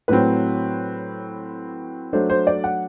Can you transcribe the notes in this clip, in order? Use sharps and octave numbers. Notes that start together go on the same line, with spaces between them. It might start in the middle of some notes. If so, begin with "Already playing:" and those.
A2 F#3 C4 B4
F#3 A3 D4 C5
C5
D5
F#5